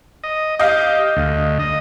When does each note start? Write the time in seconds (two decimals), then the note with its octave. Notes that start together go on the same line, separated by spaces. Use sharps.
0.24 D#5
0.59 G4 D#5 F5
1.17 D2
1.59 D#5